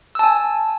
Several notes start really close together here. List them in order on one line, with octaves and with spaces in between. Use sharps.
E6 A5 G#5